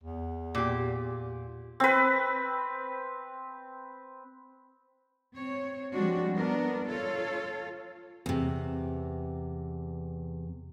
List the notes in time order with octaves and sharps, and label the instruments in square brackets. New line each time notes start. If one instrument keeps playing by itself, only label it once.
[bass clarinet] E2
[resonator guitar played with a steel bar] A#2 G4
[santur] C4 B4
[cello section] C4 C#5
F3 G3 G#3 C4 D4 F#4
B3 D4 A#4
F4 A4 C#5 F5
[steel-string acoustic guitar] E2 C3